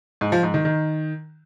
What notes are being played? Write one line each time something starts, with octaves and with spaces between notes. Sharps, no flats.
G#2
F3
G#2
D#3
D#3